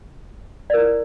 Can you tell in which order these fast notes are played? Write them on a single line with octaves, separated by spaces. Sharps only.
D5 A#4 E4